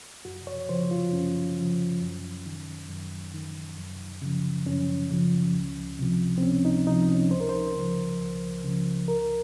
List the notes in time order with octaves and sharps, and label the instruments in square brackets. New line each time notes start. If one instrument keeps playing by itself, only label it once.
[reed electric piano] F#2 F#4
C#5
C#3 F3 C5
F4
F#2 C#4
C#3 F3
F#2
D#3
F#2
D#3
F#2
C#3 F3
F#2 C#4
C#3 F3
C#2
C3 F3
C4
C#2 C#4
D#4
C3 F3 D#4
C#4
C#2 C5
A#4
C5
C#3 F3
C#2
C#3 F3
C#2 A#4